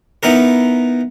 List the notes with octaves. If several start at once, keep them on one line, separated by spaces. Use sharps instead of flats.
B3 D#4 E4 A#4